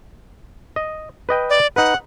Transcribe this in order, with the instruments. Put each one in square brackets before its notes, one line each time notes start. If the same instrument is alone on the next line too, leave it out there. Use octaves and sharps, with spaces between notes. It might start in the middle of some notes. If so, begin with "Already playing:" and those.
[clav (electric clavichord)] D#5
B4 D#5 G5
[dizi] D5
[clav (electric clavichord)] D#4 B4 [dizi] F#5